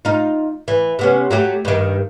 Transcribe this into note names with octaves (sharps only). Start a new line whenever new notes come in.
D#4 F4
E3
C3 B3 C#4
F#3 A3 G4
G2 D#3